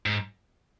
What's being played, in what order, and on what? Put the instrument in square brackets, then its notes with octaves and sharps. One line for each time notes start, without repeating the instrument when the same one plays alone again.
[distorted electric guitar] G#2